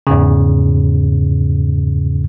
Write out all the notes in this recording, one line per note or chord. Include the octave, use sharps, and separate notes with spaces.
E2 G#2 C#3